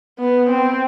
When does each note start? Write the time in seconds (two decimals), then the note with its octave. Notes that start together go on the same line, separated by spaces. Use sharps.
0.20 B3
0.50 C4